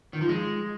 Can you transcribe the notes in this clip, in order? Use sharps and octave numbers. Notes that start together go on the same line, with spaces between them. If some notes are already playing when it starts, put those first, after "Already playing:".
D#3
F3
G#3